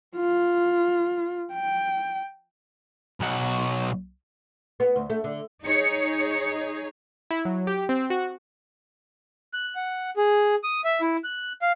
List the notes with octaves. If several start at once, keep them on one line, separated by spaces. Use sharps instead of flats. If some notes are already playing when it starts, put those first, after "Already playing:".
F4
G5
B1 F#4
B3
D2
A3
D3
D#4 G#4 C#5 C#7
E4
F#3
G4
C4
F#4
F#6
F#5
G#4
D#6
E5
E4
F#6
F5